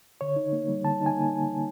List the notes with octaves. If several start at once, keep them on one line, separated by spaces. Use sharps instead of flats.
D3 C#5
D#4
A#3
G3
D3 A5
D#4
G#5
A#3